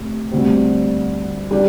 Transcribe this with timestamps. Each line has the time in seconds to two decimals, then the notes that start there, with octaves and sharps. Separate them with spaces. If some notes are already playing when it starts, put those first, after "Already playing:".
Already playing: C3 A3
0.32 D2 D3 G3 C4
1.51 G3 D4 G4